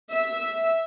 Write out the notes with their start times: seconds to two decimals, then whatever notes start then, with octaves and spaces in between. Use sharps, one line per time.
0.12 E5